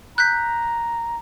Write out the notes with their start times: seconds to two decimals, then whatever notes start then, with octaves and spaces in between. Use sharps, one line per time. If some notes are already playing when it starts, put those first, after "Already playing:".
0.18 A#5 F#6 G6 B6